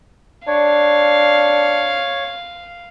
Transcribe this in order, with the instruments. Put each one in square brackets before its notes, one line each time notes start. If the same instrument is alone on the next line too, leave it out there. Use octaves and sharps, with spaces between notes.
[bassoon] D4 [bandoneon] C#5 [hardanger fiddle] F5